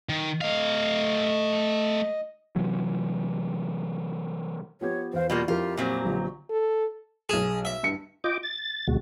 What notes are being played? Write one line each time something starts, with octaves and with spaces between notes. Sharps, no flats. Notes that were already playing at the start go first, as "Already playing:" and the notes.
D#3
A3 D#5 F5
C3 E3 F#3
F3 B3 G4 C#5
E2 C5 F5
B2 G3 A#3 F4
F2 E4 F4 G4 A#4
A#2 F#3 C4
B1 D3 F3
A4
B1 G#4 E7
E5
G2 C#7
F4 D#5 G5 D6
A6
D2 B2 G#3 F#4